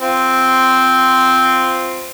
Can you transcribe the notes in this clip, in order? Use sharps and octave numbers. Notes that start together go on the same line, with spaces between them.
C4 F4